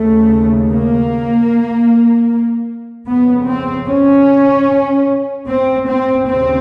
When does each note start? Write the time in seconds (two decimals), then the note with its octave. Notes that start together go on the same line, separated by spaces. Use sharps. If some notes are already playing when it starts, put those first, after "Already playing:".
Already playing: D#2 C#3 A3
0.69 A#3
3.08 F2 C#3 B3
3.47 C4
3.88 C#4
5.47 C4
5.87 C4
6.27 D#2 C#3 C4